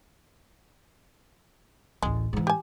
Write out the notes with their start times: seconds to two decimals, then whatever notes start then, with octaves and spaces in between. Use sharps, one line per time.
2.03 A1 D2 G#3
2.33 G#2 E3
2.47 G4 G#5